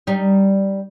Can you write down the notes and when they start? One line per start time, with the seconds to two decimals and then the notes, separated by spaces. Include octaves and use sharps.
0.07 G3 D#4